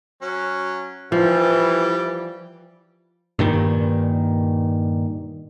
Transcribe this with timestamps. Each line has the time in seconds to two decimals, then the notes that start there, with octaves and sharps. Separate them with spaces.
0.22 F#3 C#4
1.12 E3 F3 G3 G4
3.39 G2 A#2 D#3